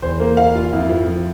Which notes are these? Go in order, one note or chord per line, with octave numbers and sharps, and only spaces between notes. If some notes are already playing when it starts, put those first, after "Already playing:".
E2 C5
A#3
F5
F4
F2 E4
F3
F3